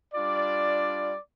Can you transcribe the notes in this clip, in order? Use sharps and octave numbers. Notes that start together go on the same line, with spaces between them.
G3 D4 F4 D5